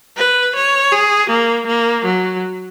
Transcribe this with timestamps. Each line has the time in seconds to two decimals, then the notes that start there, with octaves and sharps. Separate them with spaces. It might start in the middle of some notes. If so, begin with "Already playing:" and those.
0.17 B4
0.56 C#5
0.92 G#4
1.30 A#3
1.67 A#3
2.05 F#3